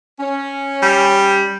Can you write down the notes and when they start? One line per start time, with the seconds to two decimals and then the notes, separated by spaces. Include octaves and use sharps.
0.20 C#4
0.82 G3